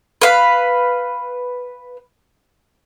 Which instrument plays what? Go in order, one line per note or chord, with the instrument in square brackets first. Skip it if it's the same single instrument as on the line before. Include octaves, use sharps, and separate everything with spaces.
[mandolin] B4 F5